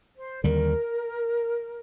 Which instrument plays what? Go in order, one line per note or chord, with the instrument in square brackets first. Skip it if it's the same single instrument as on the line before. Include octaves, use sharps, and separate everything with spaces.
[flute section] C5
[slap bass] D#2 D3 G3 [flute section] A#4